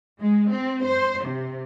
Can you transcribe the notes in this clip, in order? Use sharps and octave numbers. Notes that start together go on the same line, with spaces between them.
G#3
C4
C5
C3